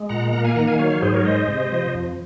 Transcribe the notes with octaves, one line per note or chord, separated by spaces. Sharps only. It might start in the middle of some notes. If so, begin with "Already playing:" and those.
Already playing: G#3
A#2 F#5 A#5
A#3 F#5 A#5
F5 G#5
D#3 F#5 A#5
F5 G#5
F#3 C#5 F5
C#5 F5
G#2 G#4 C5
A#4 C#5
G#3 C5 D#5
C3
F3
F2